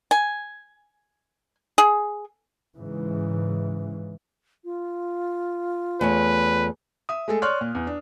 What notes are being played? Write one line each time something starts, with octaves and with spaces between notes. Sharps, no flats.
G#5
G#4
G#2 C#3 E3
F4
E2 A3 B4 C#5
E5 D#6
G#3 A3 G#4 A4
C#5 D5 C6 C#6 F6 F#6
A#2
E2
D4